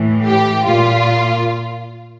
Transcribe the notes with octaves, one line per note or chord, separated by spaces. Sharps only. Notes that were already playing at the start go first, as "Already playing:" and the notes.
Already playing: A2 E3
G4
A#2 F4